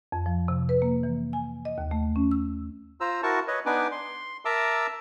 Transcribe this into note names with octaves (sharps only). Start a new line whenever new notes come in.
F2
F3
C3
B4
A#3
E3
G#5
D#5
D#2
A3
C#4
E6
F4 C5 A#5 E6
E4 F#4 A#4 A5 C#6
B4 C#5 D#5
B3 D4 D#4 B4 G#5 D6
C6
A#4 E5 A5 A#5 D6 E6